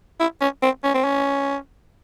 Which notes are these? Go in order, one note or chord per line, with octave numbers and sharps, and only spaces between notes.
E4
C#4
C4
C#4
C4
C#4